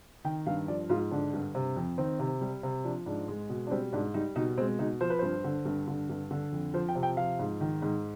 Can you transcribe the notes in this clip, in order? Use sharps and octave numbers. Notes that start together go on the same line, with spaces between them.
D#3 G5
G2 F5
F3 D5
G#2 F4
D3 D4
G2
C3
F2
D#3 C4
C3
G3
C3
F3 D4
G#2 D4
G#3
B2
D4
G3 C4
G#2 D4
G3 D#4
B2 D#4
G#3 C4
B2 D#4
F3 C5
B4
G2 C5
D3
G2
D3
G2
D3
F2
F3 C5
G5
C3
G5
F3 F5
G#2
D#3
G#2